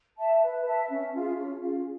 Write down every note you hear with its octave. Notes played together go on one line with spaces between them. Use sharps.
E5 A5
B4
E5 A5
C#4
F4 G#4
C#4
F4 G#4